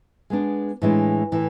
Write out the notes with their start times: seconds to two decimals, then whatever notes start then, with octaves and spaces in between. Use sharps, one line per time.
0.30 G#3 B3 D4
0.82 A2 E3 G#3 D4
1.32 A2 E3